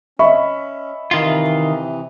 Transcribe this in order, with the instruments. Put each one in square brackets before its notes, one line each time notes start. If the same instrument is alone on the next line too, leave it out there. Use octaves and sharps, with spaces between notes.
[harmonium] C#4 [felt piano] D#5 B5 [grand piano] E5 C#6
[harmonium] C3 E3 [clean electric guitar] D#3 F4